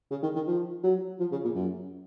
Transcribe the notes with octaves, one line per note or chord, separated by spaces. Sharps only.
C#3
D#3
D#3
F3
F#3
F3
C#3
A#2
F#2